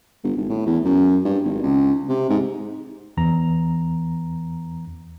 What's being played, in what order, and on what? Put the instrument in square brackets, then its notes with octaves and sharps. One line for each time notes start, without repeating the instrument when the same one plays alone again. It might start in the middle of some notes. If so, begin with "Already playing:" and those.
[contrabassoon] G1
G#1
A2
E2
F#2
G2
G#1
C#2
C3
G#2
[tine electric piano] E2 E3 A#5